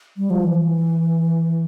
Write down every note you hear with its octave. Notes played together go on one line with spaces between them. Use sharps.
G3
F3
E3